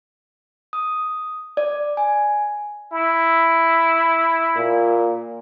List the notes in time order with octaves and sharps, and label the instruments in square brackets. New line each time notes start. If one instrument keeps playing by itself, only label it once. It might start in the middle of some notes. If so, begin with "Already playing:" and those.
[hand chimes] D#6
D5
G#5
[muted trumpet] E4
[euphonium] A#2